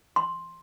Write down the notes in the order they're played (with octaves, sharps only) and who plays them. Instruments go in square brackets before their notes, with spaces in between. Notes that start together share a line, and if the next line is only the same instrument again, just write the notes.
[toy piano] C6